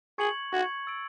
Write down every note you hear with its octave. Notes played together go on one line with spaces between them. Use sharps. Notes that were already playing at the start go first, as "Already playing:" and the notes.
G#4 C#6 G#6 C#7 F#7
F#4 C#6 G#6 C#7 F#7
E6 A6 D7 F#7